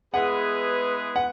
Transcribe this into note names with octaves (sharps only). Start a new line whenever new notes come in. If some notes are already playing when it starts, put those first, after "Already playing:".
G#3 B3 E4 G#4 B4 F#5
F#5